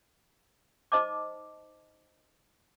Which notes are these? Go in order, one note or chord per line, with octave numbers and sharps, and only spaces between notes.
D#4 C5 D#5 A5 D6